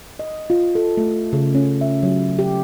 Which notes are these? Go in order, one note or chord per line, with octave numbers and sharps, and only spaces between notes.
D#5
F4
A4
A3
C#3
C#4
E5
F#3
G4